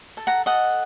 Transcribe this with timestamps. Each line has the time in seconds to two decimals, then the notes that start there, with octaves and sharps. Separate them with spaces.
0.17 A4
0.27 F#5 A#5
0.46 A4 D#5 F#5